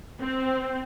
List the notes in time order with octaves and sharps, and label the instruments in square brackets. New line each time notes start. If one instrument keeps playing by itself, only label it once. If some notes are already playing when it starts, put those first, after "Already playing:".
[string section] C4